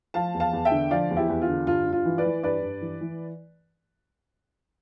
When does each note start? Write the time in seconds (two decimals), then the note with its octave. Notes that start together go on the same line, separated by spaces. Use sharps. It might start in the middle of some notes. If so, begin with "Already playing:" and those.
0.14 F3 F5 A5
0.34 E2
0.40 F5 A5
0.53 E2
0.65 E5 G5
0.71 D3
0.91 F3 D5 F5
1.11 E2
1.17 E4 G4
1.29 E2
1.42 F4
1.48 D3
1.67 G2 F4
1.86 G2
1.92 F4
2.05 E3
2.18 B4 D5
2.25 E3
2.43 G2 B4 D5
2.62 G2
2.81 E3
3.01 E3